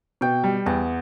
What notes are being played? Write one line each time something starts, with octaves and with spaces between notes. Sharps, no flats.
B2 G5
G3
E2 F#5